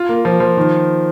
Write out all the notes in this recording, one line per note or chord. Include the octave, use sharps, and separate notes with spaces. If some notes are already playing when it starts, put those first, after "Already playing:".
Already playing: F4
A#3
F3
F3
D#3